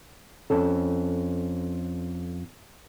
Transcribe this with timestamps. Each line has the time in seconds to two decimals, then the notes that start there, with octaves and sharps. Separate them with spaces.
0.50 F2 C#4 A4